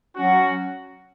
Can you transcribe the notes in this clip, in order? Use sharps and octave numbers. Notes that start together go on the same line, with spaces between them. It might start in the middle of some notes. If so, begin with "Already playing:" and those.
F#3 C#4 F#4